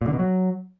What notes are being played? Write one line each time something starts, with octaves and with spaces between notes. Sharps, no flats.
A#2
D3
B2
F#3